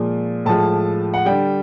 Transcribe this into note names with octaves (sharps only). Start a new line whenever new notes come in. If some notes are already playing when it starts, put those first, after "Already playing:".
Already playing: A#2 F3 G#3
A2 F3 G#3 A5
F#5
D3 G3 G5